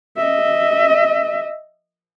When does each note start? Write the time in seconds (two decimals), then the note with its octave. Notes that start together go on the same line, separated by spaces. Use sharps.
0.17 D#5 E5